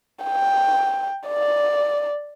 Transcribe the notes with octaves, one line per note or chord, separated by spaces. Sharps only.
G5
D5